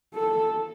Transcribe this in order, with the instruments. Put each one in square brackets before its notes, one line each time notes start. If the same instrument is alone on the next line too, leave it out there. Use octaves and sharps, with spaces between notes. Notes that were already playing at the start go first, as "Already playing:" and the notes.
[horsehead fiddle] A4